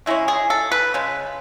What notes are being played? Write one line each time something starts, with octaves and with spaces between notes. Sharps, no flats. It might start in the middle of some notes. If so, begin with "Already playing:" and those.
C#3 G#3 C#4 E4
G#4
A4
B4
C#3 G#3